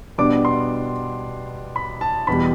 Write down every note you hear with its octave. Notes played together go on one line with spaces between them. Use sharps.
B2 G3 B3 D4 D6
C6
B5
A5
E2 B2 G3 B5